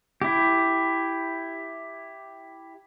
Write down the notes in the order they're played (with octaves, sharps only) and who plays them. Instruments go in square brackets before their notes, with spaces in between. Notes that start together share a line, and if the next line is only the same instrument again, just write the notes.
[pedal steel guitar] E4 G4